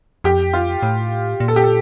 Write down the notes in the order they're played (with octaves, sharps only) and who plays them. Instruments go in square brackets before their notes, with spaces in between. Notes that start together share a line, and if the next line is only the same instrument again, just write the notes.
[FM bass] F2 [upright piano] G4
[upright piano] F4
[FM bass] A2
A#2
[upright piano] A4
G4
A4